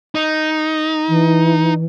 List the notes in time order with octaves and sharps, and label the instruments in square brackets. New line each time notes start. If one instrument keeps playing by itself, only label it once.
[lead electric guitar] D#4
[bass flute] E3